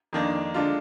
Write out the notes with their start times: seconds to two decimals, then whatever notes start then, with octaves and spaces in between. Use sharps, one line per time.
0.13 F2 D#3 A#3 D4
0.54 D3 G#3 D4 F4